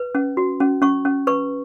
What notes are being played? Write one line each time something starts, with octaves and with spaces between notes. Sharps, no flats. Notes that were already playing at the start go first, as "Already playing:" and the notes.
Already playing: B4
C#4
F#4
C#4
C#4 C#6
C#4
B4 C#6